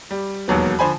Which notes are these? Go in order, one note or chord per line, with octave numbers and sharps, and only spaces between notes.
G3
E1 D#2 F#3 B3
D3 F3 C5 G#5 B5